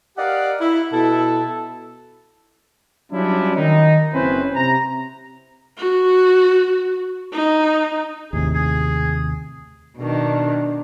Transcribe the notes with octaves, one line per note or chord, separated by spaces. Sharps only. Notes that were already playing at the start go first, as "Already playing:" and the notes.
G4 A#4 D5 D#5 F5 F#5
E4
B2 E4 A4
F#3 G3 C#4 D4 E4 F4
D#3 D#4
F#1 C4 C#4 E4 B4 C5
C3 A#5
F#4
D#4
D#2 A2 C3 G#4
G#4
B2 D#3 D4